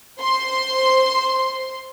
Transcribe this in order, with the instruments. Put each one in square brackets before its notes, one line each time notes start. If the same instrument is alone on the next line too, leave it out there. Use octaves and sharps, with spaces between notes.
[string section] C5 C6